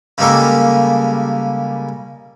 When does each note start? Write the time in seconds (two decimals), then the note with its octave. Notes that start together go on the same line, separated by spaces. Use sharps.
0.18 C#3 G3 G#3 A#3 A4